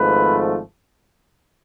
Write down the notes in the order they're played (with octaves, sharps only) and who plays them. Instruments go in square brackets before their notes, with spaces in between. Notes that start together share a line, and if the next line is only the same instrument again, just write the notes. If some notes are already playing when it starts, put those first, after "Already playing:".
Already playing: [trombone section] G#1 G#2 F3 A3 B4